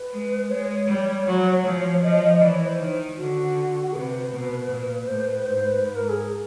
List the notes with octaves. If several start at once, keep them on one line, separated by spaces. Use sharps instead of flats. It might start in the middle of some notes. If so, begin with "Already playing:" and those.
Already playing: B4
G#3
G#3 C#5
G3
F#3
F3
F3 D#5
D#5
D#5
E3 D5
C#5
C5
D#3
D3 F#4
C3 B4
B2
A#2
A2 C5
B4
B4
G#2 C5
B4
G#2 B4
A#4
G#4